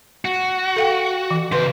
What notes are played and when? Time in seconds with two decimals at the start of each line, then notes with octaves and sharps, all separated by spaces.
0.25 F#4
0.76 A4 F5 G5
1.31 E3
1.52 C#3 B4 C5 C6